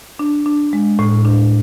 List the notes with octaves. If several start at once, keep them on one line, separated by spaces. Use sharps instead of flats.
D4
D4
G#3
A2
D4